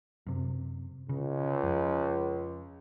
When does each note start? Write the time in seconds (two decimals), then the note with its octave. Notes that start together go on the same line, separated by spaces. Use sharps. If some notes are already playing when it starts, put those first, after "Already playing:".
0.26 F#2 C3
1.09 C#2 C#3
1.63 F2